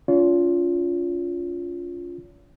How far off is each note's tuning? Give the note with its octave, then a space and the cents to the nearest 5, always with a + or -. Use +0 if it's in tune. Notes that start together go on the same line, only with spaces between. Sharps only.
C#4 +40 F4 +0 C#5 +40